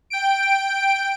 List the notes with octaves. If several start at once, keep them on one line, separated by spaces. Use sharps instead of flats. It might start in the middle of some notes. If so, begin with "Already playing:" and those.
G5 D7